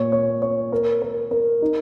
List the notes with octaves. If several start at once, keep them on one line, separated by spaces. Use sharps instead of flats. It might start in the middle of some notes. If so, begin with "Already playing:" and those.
Already playing: A#2 C#5
C#5
C#5
A#4
A#4
A#4
D#4